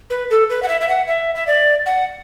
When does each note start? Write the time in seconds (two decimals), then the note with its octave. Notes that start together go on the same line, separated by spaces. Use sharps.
0.10 B4
0.30 A4
0.50 B4
0.63 F#5
0.68 E5
0.81 E5
0.89 F#5
1.07 E5
1.35 E5
1.47 D5
1.86 F#5